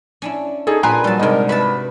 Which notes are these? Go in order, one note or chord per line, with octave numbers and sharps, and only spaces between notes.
C#4 D4 E4
D#4 G#4 A4 C#5
A#2 D4 A#4 B4 G#5 A#5 C6
F#3 G3 A5
G#2 C3 D4 A#4 D#5
F#4 B4 E5 A5 B5